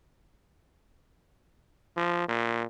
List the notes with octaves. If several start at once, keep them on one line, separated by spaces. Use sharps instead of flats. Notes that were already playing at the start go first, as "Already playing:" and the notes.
F3
A#2